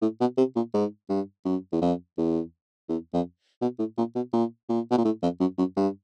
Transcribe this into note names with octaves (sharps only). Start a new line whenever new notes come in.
A2
B2
C3
A#2
G#2
G2
F#2
E2
F2
E2
E2
F2
B2
A2
A#2
B2
A#2
A#2
B2
A#2
A2
F2
F#2
F#2
G2